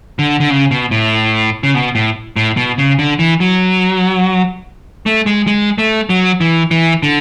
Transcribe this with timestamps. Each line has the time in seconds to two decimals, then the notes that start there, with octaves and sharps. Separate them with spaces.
0.19 D3
0.40 D3
0.50 C#3
0.71 B2
0.91 A2
1.63 C#3
1.74 B2
1.95 A2
2.36 A2
2.57 B2
2.78 C#3
2.99 D3
3.19 E3
3.40 F#3
5.06 A3
5.26 G#3
5.47 G#3
5.78 A3
6.09 F#3
6.41 E3
6.71 E3
7.03 D3